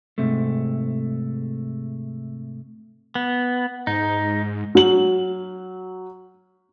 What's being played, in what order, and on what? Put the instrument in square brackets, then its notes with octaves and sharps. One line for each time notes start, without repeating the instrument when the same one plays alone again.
[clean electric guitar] G#2 C3 A3
[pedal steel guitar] B3
[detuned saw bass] G#2 [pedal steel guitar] D#4
[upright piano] F#3 F#7